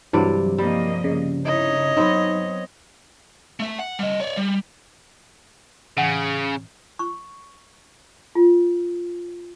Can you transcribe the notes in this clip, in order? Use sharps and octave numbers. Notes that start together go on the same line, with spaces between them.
G2 C3 E3 F#3 D5
F3 G3 A#3 D#5
C#3
D#4 E4 C#5 D#5
F#3 B3 C4 D#4
A3 E5
F#5
G3 D#5
C#5 D5
G3
A2 C#3 E3 F#5
C#6
F4